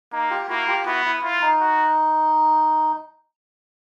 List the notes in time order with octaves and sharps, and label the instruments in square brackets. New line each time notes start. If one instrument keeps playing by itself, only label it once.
[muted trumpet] A#3 [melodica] D#4
[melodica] F4 G4
[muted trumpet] A#3 [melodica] E4 F#4
[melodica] F4 G4
[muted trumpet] B3 [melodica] E4 F#4
[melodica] E4
[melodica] E4 [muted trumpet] F4
[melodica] D#4
[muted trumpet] F#4